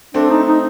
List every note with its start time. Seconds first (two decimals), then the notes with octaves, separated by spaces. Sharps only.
0.14 A3 C4 D4
0.30 D#4
0.47 D#4